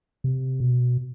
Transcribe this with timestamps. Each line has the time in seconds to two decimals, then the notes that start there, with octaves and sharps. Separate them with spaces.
0.24 C3
0.60 B2